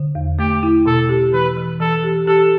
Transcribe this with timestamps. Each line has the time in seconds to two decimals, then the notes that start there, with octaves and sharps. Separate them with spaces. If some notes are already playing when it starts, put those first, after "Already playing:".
Already playing: D3
0.15 E2
0.39 A3 G4
0.63 E4
0.86 B2 A4
1.09 G4
1.33 E3 B4
1.57 E3
1.80 E3 A4
2.04 G4
2.27 G4 A4